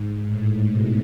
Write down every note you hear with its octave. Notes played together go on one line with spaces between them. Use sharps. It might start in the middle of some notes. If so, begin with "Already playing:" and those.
Already playing: G#2
A2
B2